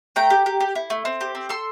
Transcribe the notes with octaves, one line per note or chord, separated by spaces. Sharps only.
A3 G5 A#5
G4
G4
G4
E4
A3
C4
G4
C4
A4 C6 E6